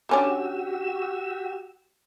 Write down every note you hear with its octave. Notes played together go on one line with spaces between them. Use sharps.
D3 C#4 D4 F#4 G4 E6